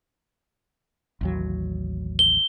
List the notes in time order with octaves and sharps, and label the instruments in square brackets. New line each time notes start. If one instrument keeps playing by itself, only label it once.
[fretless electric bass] A1 D#2 F#3
[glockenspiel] G7